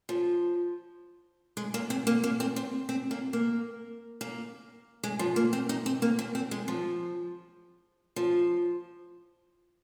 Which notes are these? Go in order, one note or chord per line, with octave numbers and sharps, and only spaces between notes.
F3
G#3
A#3
C4
A#3
A#3
C4
C4
C4
A#3
A#3
A#3
G#3
F3
A#3
C4
D#4
C4
A#3
C4
C4
G#3
F3
F3